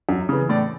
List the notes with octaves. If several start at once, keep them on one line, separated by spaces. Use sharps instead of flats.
F#2
C#3 E3
A2 D5